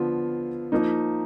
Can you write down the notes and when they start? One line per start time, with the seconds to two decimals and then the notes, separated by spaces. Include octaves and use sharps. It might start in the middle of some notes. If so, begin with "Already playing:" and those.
Already playing: D3 F3 B3 F4
0.72 F3 A#3 D#4